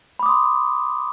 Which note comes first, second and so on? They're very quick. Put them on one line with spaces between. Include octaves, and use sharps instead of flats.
B5 D6 D#6 C6